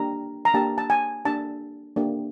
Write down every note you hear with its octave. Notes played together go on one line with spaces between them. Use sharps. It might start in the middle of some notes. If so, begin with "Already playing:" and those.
Already playing: A#3 D4 G4 A#5
A#5
A#3 D4 G4 A5
A5
G#5
A#3 D4 G4 A5
A#3 D4 G4